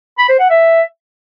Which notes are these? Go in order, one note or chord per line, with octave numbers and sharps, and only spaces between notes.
B5
C5
F#5
E5